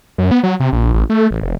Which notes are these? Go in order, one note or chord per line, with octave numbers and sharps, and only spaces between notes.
F#2
B3
F#3
C3
A#1
A1
A3
A1
F1